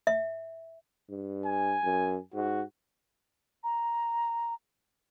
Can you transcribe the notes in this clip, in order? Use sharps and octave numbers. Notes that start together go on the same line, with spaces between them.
E5
G2
G#5
F#2
G#2 F#4
A#5